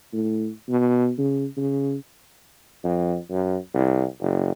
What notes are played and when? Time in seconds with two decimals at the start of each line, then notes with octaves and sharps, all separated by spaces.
0.13 A2
0.68 B2
1.18 C#3
1.57 C#3
2.84 F2
3.31 F#2
3.74 C2
4.21 F#1